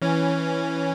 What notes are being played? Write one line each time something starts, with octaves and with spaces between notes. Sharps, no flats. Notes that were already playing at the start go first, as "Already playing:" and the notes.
E3 C#4